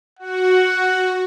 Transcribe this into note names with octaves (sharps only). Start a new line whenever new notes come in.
F#4 F#5